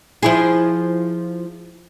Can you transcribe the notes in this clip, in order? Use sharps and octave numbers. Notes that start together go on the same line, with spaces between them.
F3 E4 G#4